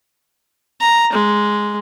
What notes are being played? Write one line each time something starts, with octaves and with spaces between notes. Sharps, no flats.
A#5
G#3